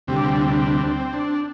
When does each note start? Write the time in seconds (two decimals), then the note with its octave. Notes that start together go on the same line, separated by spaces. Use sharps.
0.07 D2 C3 G3 C4
0.16 D4
0.24 C4
0.33 D4
0.41 C4
0.50 D4
0.58 C4
0.66 D4
0.74 C4
0.83 D4
0.91 C4
1.13 D4